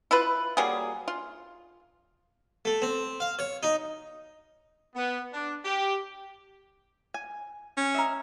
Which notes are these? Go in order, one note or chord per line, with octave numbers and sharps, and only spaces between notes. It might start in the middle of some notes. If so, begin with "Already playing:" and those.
E4 F4 B4
F#3 G3 A#3 G#4
F4
A3
C4
F5
C#5
D#4
B3
D4
G4
G#5
C#4
A#4 D#5 E5